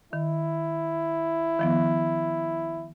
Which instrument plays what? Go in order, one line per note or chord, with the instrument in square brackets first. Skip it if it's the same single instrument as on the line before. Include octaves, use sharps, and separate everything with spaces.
[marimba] D#3 [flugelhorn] E4
[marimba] D#3 F3 B3